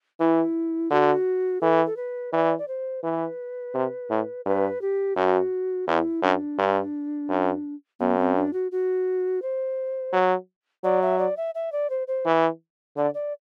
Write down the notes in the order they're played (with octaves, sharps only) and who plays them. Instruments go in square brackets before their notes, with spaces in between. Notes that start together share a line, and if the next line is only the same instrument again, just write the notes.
[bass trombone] E3 [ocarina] E4
[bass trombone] D3 [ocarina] F#4
[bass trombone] E3 [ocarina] A4
[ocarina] A4
B4
[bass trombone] E3 [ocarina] D5
[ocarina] D5
C5
[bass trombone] E3 [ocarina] B4
[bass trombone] C3
A2
[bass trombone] G2 [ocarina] B4
[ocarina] G4
[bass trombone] F#2 [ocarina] F#4
[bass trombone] E2 [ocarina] E4
[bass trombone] F#2 [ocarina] D4
[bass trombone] G2
F#2
[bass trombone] F#2 [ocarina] B3
[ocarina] C4
D4
F#4
F#4
C5
[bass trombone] F#3
[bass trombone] F#3 [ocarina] D5
[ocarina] E5
D5
E5
E5
D5
C5
C5
[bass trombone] E3
[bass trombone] D3 [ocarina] D5
[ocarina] D5